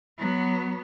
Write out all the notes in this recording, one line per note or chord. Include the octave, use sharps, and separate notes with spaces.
F#3 B3